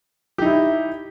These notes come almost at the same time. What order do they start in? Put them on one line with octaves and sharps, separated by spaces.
G4 D#4 E4